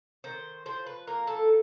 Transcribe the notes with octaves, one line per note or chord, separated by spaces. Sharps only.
D#3 C5
F3 C5
B4
A#3 A#4
A4